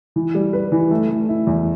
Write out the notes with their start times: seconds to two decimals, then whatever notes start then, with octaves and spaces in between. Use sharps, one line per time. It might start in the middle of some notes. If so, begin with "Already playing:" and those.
0.16 E3
0.34 G3
0.53 B4
0.72 E3
0.91 A3
1.10 A3
1.29 E4
1.47 E2